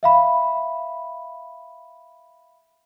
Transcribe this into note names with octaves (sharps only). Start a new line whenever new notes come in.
E5 F5 B5